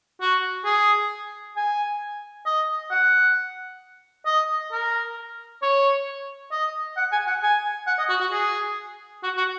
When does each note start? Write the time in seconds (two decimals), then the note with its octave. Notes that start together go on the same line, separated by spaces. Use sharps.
0.21 F#4
0.65 G#4
1.57 G#5
2.46 D#5
2.91 F#5
4.26 D#5
4.72 A#4
5.62 C#5
6.52 D#5
6.97 F#5
7.12 G#5
7.27 F#5
7.43 G#5
7.87 F#5
7.99 D#5
8.09 F#4
8.21 F#4
8.32 G#4
9.23 F#4
9.37 F#4